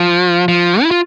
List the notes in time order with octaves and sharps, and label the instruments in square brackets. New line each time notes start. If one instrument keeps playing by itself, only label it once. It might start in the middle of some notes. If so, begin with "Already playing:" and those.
Already playing: [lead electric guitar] F3
F3
E4
F4